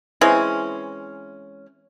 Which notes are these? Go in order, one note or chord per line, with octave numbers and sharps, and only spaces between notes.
E3 G#3 C4 C#4